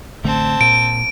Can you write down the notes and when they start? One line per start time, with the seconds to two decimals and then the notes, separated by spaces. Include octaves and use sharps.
0.24 A1 D3 A3 C4 A5
0.61 A#2 D7